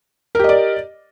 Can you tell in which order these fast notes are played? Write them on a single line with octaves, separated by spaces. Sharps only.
A#4 G4 D#5 D5